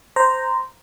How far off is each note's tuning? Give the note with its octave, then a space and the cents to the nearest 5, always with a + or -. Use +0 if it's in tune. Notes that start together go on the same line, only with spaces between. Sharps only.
C5 -10 A#5 +0